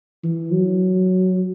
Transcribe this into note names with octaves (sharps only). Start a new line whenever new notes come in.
E3
F#3